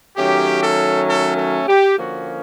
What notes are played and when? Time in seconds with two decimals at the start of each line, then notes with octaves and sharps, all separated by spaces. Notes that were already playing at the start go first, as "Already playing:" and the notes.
0.17 D#3 F#3 A3 C#4 G4
0.62 A4
1.07 A4
1.37 A4
1.68 G4
1.98 D3 F3 A#3 C#4 F#4